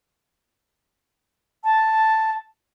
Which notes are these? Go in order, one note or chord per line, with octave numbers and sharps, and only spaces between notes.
A5